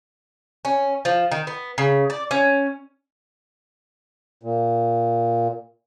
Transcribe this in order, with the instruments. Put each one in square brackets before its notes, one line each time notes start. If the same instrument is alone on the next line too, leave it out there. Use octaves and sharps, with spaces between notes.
[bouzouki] C#4
F3
D#3
B3
C#3
D5
C#4
[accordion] A#2